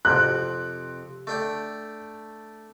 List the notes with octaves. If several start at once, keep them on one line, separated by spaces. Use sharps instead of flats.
F2 C3 F#6
A3 D4 G5